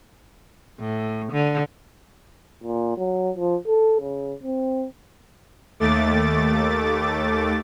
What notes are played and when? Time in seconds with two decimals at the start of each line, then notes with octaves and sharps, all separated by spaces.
0.79 A2
1.32 D3
2.64 A#2
2.97 F#3
3.37 F3
3.67 A4
4.01 C#3
4.43 C4
5.80 D#2 A3 D6 A6